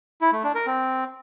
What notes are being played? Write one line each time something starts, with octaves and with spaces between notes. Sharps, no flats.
E4
A3
D4
A#4
C4